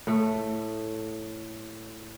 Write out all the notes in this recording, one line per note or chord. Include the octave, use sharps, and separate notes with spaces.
A2 A3